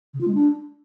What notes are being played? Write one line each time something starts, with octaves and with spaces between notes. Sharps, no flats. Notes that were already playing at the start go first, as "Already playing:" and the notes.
C#3
F4
G#3
D4